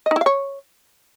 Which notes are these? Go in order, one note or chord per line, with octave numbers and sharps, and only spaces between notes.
D#5
D#4
E4
F5
C#5